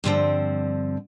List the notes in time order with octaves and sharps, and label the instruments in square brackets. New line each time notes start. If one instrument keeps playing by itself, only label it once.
[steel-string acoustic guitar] G2 D3 F3 C4